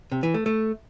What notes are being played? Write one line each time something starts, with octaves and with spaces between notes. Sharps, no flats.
C3
E3
A3
A3